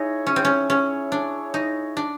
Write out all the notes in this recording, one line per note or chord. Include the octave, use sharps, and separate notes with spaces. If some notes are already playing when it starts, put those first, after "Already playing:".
Already playing: D#4 E4 G#4 C#5 E5
C#4
C4
C#4
C#4
D4
D#4
D4